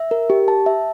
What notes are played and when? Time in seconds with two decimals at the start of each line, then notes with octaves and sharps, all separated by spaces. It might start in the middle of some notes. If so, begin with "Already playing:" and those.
Already playing: E5
0.11 A#4
0.30 G4
0.48 A5
0.66 E5